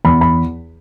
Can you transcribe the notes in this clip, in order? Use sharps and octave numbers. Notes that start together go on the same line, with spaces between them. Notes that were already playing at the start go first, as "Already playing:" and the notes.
E2 B5
B5